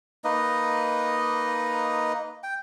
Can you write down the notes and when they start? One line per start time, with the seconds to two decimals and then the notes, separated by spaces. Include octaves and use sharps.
0.24 A#3 D#4 B4 D#5
2.43 G5